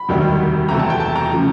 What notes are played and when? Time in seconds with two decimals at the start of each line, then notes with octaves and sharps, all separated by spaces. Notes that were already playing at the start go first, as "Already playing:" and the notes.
Already playing: B5
0.08 E1 D2 C3 D#3 G3
0.69 E2 C3 E3 A3 A#5
0.79 A5
0.90 G5
1.00 A5
1.16 A#5
1.32 C#3 F3 A3